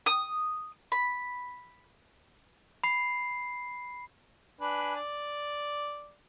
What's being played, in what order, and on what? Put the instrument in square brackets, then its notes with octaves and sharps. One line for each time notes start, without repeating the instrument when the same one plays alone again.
[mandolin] D#6
B5
[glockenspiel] B5 C7
[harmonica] D4 B4 G#5
D5